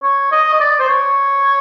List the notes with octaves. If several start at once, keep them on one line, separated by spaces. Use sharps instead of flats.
C#5
D#5
D#5
D5
C5
C#5